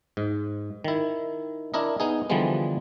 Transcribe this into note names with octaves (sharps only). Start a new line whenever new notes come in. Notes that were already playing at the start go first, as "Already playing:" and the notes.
G#2
D#3 E4
D4 E4 A#4 D#5
B3 D#4 G#4
D3 E3 F3 G3 G#3 B3